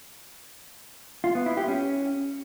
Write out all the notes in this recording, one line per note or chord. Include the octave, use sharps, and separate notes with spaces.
F4
B3
E4
G4
C#4